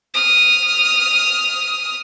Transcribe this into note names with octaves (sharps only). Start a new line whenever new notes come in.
D#6 F6